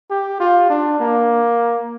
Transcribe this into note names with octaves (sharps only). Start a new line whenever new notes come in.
G4
F4
D4
A#3